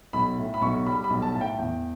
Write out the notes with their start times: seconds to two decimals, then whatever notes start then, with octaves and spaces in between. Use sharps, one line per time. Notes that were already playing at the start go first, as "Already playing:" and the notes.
0.13 B1 B5
0.38 A2
0.54 B5
0.62 B1 C#6
0.86 G3 B5
1.04 B5
1.10 B1
1.22 A5
1.35 A2 A5
1.41 G5
1.59 E2 G5